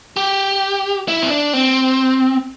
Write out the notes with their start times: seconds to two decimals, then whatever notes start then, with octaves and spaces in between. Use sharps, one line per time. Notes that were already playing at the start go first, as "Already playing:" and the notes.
0.17 G4
1.08 E4
1.22 C4
1.30 D4
1.53 C4